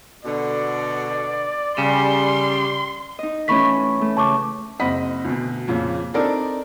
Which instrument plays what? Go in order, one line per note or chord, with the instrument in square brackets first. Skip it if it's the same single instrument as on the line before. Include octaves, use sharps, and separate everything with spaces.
[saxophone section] B2 D3 [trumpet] D5
[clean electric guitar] C#3 [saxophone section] G3 [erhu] C6
[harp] D#4 D#5
[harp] E3 A3 C#4 [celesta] B5 C#6 B6
[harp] A3
[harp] C#3 [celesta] A5 C#6 D6
[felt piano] F#1 C4 D#5 F#5 B5 B6
D2 B2
F2 A#2 C#3
C4 D4 D#4 A4 A#4 D5